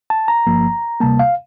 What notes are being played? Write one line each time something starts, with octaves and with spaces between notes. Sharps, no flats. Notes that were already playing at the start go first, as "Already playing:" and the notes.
A5
A#5
G1 G2 F3 A#3
D2 C3 G3 A#3 A5
F5